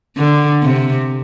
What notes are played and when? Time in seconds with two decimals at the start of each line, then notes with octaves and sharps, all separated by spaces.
0.18 D3
0.63 C3